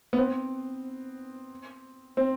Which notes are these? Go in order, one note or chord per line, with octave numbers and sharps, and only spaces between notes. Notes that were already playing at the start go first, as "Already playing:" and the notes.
B3
C4
C4